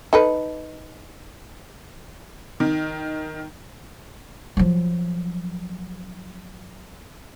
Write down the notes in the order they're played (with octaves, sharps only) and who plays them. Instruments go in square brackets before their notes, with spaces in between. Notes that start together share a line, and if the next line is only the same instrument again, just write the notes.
[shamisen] D#4 A4 B4
[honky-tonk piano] D#3
[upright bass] F3 F#3